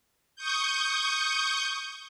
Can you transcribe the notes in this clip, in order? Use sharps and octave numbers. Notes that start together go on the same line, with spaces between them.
C#6 D#6 G6